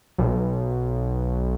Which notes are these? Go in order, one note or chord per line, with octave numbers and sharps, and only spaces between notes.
B1